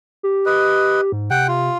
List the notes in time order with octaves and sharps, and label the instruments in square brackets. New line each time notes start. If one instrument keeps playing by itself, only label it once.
[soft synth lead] G4
[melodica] B4 D#5
[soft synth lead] G#2
[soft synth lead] C3 [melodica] F#5 G5
[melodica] F4